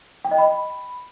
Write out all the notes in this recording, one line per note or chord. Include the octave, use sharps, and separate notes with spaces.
G5
D#5
B5